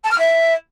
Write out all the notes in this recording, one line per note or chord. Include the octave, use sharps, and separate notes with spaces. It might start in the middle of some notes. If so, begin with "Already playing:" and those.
A5
F6
E5